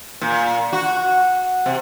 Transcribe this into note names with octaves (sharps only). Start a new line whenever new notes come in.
A#2
F#4
C3